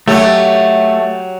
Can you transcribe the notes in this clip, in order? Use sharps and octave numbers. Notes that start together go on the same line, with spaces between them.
F#3 A3 G4